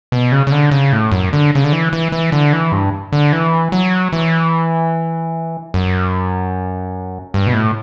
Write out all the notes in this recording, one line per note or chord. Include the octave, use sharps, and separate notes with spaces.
B2
C#3
C#3
D3
C#3
A2
F#2
D3
C#3
D3
E3
E3
E3
D3
E3
G2
D3
E3
F#3
E3
F#2
G2
B2
A2